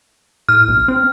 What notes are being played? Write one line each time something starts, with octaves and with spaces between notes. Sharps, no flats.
A2 F6
B1
C4